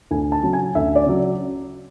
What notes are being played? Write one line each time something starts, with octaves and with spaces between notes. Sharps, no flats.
D2 G#5
A5
C#3 F#3
G#5
D2 E5
D5
C#3 F#3